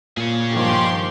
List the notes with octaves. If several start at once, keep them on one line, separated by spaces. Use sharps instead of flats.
A#2 G#4 C#5
G2 D#3 F3 G4 C6